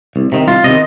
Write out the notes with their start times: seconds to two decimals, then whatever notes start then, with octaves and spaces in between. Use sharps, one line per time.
0.16 C2
0.32 C3 D#3
0.47 C2 F4
0.64 C3 D#3 D#5